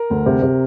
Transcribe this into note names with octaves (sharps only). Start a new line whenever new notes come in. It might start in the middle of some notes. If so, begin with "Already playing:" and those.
Already playing: A#4
D2
C3
C3